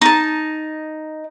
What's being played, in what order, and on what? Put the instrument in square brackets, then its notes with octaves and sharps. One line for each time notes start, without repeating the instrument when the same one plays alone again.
[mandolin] D#4 A5